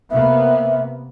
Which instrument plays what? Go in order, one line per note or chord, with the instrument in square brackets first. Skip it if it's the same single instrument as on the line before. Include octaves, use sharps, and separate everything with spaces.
[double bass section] C3 A#3 B3 [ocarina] E5